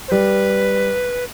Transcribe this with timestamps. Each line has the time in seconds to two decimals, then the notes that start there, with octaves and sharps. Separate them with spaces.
0.08 C5
0.11 G3 B4